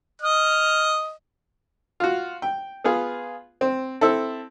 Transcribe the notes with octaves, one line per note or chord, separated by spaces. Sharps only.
D#5 F6
F4 F#4
G5
B3 F4 G#4
C4
C4 E4 A4